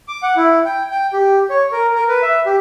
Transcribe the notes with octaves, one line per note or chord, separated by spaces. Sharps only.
D6
F#5
E4
G5
G5
G4
C#5
A#4
A#4
B4
E5
G4